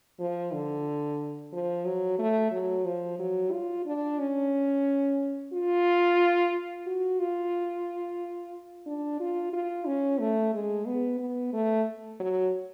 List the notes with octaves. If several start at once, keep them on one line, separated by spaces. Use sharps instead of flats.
F3
D3
F3
F#3
A3
F#3
F3
F#3
F4
D4
C#4
F4
F#4
F4
D4
F4
F4
C#4
A3
G#3
B3
B3
A3
F#3